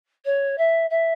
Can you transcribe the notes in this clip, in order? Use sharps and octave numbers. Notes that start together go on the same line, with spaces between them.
C#5
E5
E5